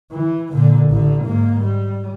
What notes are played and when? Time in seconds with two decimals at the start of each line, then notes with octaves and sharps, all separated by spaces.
0.12 E3
0.52 A#2 D3
0.90 A1 D3
1.24 G#2 A#3
1.61 G3